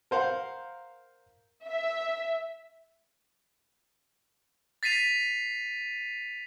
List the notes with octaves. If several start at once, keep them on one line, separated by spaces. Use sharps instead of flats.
A#4 C5 F5 F#5
E5
A6 B6 C7 D#7 F7